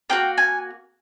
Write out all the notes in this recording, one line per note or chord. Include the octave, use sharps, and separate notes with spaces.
A#3 D4 F#4 G5
G#5